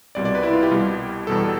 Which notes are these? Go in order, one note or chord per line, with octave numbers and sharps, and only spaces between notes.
C2 B2 G3 D5
D5
B4
E4
F4
G4
C2 B2 G3
E2 B2 G3 A4